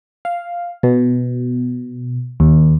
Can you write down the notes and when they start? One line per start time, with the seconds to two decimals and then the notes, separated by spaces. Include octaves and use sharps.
0.25 F5
0.83 B2
2.40 D#2